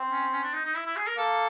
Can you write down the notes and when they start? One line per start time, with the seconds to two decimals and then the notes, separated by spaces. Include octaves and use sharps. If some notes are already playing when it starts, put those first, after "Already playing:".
Already playing: C4
0.11 C#4
0.32 C#4
0.43 D4
0.53 D#4
0.64 D#4
0.75 E4
0.85 E4
0.96 G#4
1.07 A#4
1.17 A#3 A4